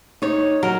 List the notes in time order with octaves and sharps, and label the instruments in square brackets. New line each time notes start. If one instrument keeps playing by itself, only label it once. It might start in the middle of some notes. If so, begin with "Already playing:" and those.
[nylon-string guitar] D#4 [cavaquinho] C#5
[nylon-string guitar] F#3 [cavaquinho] A#4